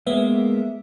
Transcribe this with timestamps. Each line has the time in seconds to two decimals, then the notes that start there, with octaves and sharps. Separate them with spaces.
0.06 G#3 A#3 B3 E5